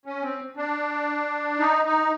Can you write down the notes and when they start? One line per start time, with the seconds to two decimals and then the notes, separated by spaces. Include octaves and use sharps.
0.05 C#4
0.22 C4
0.57 D4
1.59 D#4
1.85 D#4